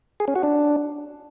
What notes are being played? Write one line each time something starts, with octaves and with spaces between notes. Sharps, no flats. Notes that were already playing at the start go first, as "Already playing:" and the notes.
G#4
C#4
F#4
D4